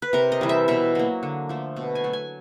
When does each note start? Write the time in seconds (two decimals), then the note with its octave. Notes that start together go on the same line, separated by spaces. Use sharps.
0.02 B4
0.13 C3 A#4
0.32 D#5
0.41 E3 G3
0.49 E5
0.68 B2 E5
0.95 F#3 A#3
1.23 D3
1.49 F3 A3
1.76 B2
1.95 G#5
2.04 F#3 A3
2.13 G#5